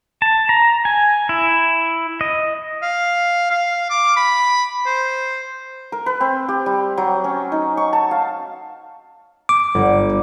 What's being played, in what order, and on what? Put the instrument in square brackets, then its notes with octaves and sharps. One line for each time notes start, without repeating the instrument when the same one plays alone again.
[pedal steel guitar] A5
A#5
G#5
E4
D#5
[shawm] F5
F5
D6
B5
C5
[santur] A#4
B4
C4
G4
G3
F#3
C#4
D#4
C#6
A5
F5
[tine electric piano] D6
[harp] G1